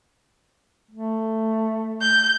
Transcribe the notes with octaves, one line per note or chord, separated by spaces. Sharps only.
A3
G6